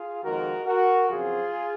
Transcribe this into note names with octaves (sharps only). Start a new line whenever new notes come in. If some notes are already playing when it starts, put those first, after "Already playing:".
Already playing: F4 G#4
F2 D#3 G#3 F#4 A#4
F#4 A#4
F2 C#3 F#3 C4 F4 G#4